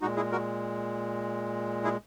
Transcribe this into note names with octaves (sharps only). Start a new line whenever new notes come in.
A#2 G#3 D#4 F#4
E4 G#4
F#4 A#4
E4 G#4